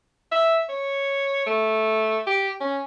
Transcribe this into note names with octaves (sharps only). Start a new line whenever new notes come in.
E5
C#5
A3
G4
C#4